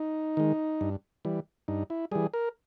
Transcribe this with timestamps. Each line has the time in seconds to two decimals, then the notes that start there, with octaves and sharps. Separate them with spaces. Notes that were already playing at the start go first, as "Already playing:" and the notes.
Already playing: D#4
0.37 D#3 G#3
0.81 G2
1.25 E3 G3
1.68 G2 D#4
1.90 E4
2.12 E3 G3 G#4
2.34 A#4